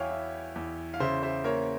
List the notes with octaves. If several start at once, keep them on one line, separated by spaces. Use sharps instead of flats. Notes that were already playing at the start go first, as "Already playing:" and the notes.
Already playing: E2 E4 C#5 E5 F5 G5 G#5
E4
E2
F5
C#3 C5 E5
C5 E5
A#3 A#4 C#5